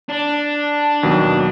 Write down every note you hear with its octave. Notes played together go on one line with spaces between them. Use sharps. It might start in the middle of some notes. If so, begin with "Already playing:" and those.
D4
D#2 B2 F#3